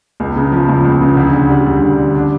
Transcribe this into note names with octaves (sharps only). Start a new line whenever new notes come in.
C#2
C#3
F3
C#2
C#2
C#3
D2
D3
G3
D2
D2
D3
D4